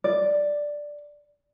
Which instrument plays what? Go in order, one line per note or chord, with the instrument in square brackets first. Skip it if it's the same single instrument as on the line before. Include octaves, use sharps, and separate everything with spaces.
[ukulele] D5